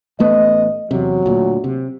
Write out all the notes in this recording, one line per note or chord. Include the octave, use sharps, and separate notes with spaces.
A1 A3 B3 D#5
E2 C3 F#3
D2 A#2
C3